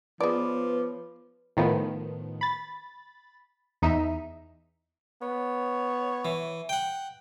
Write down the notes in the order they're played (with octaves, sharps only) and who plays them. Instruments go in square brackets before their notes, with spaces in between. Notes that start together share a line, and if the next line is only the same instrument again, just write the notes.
[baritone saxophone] F3 [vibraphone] B3 C#5 D6 [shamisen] G#4 D5 [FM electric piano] B4
[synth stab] A2 D#3 F3 B3
B5 A6
E2 D#4 E5
[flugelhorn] B3 [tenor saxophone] C#5
[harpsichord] E3
F#5 G5